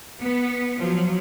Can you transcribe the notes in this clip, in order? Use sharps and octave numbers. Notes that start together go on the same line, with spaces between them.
B3
F3 F#3